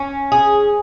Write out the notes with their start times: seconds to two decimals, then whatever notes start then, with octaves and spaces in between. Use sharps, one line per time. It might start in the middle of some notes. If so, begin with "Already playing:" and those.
Already playing: C#4
0.32 G#4